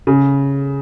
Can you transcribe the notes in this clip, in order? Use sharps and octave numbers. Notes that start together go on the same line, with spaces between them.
C#3